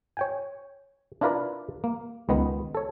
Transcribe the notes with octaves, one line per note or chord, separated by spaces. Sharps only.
C#5 G5 G#5
D4 E4 F4 A#4 B4 D5
A#3
C#2 D#3 B3
A4 C#5